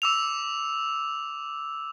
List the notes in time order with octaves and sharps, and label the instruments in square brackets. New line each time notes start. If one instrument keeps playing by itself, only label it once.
[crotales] D6 E6 F7